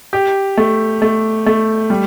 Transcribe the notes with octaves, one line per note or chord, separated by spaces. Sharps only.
G4
A3
A3
A3
G3